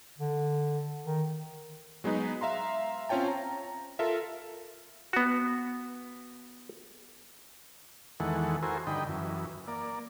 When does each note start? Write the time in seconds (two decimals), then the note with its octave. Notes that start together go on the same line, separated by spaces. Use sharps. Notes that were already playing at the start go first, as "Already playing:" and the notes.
0.19 D3
1.05 D#3
2.04 F#3 G#3 B3 D#4 B4
2.41 E5 F5 A#5 C6
3.09 C4 C#4 F4 C#5 G5 A5
3.28 A#5
3.99 F4 A4 A#4 E5
5.13 B3 F#4
8.20 E2 D#3 E3 G#3 A4 F#5
8.63 E4 F#4 A4 A#4 C5 G#5
8.87 G2 D3 D#4 D#5 G5 B5
9.09 F#2 E3
9.68 A#3 D5